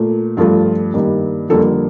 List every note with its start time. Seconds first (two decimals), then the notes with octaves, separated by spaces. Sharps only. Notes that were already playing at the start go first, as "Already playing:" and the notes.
Already playing: A#2 A3
0.37 G2 F3 A3 F4
0.94 G2 D#3 G3 A#3
1.49 F2 D3 G3 A#3 A4